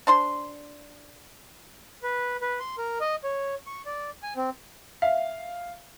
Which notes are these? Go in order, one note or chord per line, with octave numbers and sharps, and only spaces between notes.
D4 C5 C6
B4
B4
C6
A#4
D#5
C#5
C#6
D5
G#5
C4
E5 F5